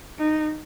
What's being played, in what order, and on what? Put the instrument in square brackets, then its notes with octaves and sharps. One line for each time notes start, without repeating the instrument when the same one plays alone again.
[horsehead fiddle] D#4